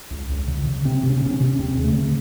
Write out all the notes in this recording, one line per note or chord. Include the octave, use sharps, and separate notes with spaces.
C#2
C#2
C#3
C#3
C3 C4
C3
C#4
C4
C3 C#4
C#4
C3
D#2 C4
C#3
A3
C#3